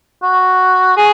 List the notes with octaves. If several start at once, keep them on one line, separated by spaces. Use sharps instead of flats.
F#4
G#4